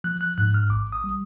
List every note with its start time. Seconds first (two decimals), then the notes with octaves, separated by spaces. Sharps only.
0.04 F3 F#6
0.21 F#6
0.38 G#2 F#6
0.54 F6
0.70 A1 D6
0.92 D#6
1.04 G3